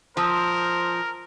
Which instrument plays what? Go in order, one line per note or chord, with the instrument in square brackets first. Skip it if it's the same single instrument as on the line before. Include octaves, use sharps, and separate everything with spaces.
[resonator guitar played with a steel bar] F3 [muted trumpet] A#4 [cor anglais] C5 [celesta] A5 D#6 E6